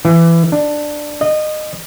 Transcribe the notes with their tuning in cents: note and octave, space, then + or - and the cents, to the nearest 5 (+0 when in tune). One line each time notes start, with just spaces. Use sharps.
E3 +20
D4 +10
D#5 -25